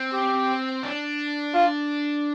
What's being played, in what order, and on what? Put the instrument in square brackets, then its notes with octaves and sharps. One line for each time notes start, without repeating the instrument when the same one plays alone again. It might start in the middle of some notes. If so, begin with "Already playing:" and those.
Already playing: [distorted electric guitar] C4
[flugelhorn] G4
[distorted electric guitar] D4
[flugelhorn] F4